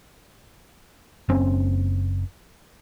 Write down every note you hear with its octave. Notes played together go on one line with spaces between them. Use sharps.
F#1 C4 C#4